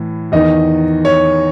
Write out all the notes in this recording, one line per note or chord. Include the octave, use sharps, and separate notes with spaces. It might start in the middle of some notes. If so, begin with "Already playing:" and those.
Already playing: A2 E3
E2 D#3 D#5
C#5